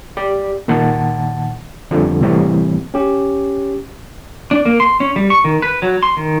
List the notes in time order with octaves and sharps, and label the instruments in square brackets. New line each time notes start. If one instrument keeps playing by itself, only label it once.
[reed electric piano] G4 D5
A#2 D#3 F#5 A5
F2 D3 F3 G3
C2 A2 E3 G3 C4
[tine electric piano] C#4 G4
[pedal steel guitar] D4
A#3
C6
C#4
G3
C#6
D#3
B4
F#3
C6
D#3